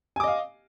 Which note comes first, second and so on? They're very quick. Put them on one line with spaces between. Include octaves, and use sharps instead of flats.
G#5 D6 D#5 F5